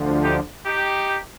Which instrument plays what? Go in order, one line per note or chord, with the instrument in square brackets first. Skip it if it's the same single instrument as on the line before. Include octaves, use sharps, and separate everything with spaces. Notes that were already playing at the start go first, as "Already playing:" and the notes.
Already playing: [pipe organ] D2 D3 F3
[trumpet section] D#4 G4
D#4 G4